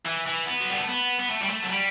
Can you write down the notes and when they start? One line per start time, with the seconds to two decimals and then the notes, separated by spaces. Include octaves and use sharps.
0.05 E3
0.26 E3
0.46 B3
0.60 F#3
0.69 G3
0.78 A3
0.87 B3
1.19 B3
1.29 A3
1.42 G3
1.49 A3
1.62 F#3
1.70 G3